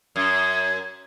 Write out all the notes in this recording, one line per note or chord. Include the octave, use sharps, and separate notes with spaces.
F#2 G#6